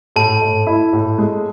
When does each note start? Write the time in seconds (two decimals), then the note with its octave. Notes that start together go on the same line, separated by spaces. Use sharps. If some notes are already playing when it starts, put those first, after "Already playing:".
0.16 A2 A5
0.42 A2
0.67 E4
0.93 A2
1.18 G#3